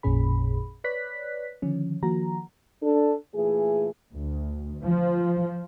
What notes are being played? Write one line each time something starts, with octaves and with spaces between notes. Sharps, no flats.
A1 F2 A#2 C#4 G#4 B5
B4 C#5 D5 F#6 B6
D3 D#3 F3 C#4
D#3 F3 A#3 F#4 A#5
D4 A4
A#2 E3 A3 G#4
D2
F3